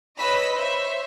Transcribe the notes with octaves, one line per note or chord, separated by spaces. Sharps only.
B4 C#5 D#5 B5 E6 B6
C5 C#5 E5